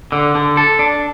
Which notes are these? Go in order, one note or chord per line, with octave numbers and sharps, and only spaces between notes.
D3
D3
A4
D4